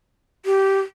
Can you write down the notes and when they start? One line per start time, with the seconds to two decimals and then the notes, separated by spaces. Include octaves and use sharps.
0.46 G4